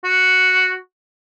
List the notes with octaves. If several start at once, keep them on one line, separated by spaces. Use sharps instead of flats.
F#4